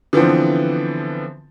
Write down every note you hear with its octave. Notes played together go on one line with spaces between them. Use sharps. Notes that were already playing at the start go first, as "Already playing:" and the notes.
D3 E3 F3 B3 C4